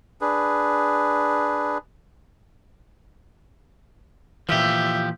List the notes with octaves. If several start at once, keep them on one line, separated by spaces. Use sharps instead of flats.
D4 G#4 B4
A#2 E3 F3 G4 E5